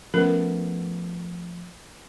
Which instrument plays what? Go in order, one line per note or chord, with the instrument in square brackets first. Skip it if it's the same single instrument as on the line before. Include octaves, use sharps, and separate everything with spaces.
[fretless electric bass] F3 A3 B3 [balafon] C#4 A#4